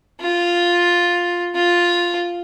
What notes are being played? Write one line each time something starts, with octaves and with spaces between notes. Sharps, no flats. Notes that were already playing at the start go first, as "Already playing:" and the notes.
F4
F4